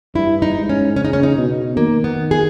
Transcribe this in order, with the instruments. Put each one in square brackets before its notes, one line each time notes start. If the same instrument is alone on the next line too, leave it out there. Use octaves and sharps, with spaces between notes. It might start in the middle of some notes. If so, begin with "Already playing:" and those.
[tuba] G2 [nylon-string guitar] E4
[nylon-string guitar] D#4
[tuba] G#2
[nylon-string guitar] C#4
[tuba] C#3 [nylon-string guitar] C#4
[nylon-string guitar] D#4
C#4
D#4
[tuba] B2
[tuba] D#3 [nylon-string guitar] A#3
[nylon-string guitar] B3
G#4